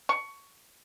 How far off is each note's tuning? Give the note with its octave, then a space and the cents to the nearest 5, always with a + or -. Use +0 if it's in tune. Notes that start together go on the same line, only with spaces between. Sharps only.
C#6 +15